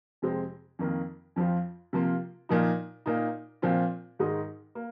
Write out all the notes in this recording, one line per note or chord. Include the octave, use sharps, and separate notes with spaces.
F2 C3 G#3 C4
F2 D#3 A#3
F2 F3 C4 F4
C3 F3 A#3 F4
A#2 F3 A#3 D#4
A#2 A#3 D#4
A#2 F3 C4 F4
G#2 D#3 G#3 D#4
A#3